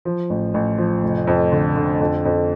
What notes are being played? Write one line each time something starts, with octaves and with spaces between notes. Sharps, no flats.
F3
A1
A1
F3
F1
F2
D3
D3
F2
F2